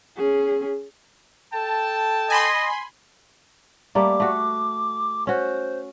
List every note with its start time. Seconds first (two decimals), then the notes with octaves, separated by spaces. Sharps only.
0.17 C#4 G#4
1.53 A4 G5 A5
2.30 D#5 G#5 B5 C6
3.95 G3 A3 A#3 D6
4.20 A3 F#4
5.27 C#4 F#4 C5